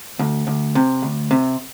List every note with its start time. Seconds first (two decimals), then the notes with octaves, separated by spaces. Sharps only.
0.19 D2
0.47 D2
0.75 C3
1.02 D2
1.31 C3